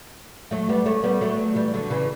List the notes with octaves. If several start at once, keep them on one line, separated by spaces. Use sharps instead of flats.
F#3 A3
G3 B3
A3 C#4
G3 B3
F#3 A3
E3 G3
D3 F#3
C#3 E3